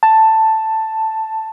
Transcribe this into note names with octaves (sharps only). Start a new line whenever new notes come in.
A5